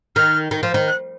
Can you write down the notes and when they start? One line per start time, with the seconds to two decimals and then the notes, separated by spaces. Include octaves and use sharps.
0.16 D#3 F6
0.51 D#3
0.63 F3
0.74 D#3
0.88 F#6